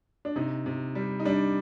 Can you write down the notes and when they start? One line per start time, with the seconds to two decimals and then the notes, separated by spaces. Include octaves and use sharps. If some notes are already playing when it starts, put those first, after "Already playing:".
0.25 D4
0.36 C3 D#4
0.66 C3
0.95 G3
1.20 D#4
1.25 G3 D4